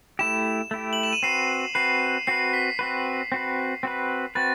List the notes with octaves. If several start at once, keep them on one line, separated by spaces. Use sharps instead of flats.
A3 E4 G4 E7
A3 E4 G4
F#7
E7
D#7
C4 F#4 B4 C7
C4 F#4 B4 C7
C4 F#4 B4 C7
B6
C4 F#4 B4 B6
C4 F#4 B4
C4 F#4 B4
C4 F#4 B4 A6